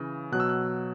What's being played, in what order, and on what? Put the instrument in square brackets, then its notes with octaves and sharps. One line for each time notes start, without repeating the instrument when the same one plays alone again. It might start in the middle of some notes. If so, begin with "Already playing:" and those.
Already playing: [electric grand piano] C#3 E3
B2 F#3 F#6
E6
F#6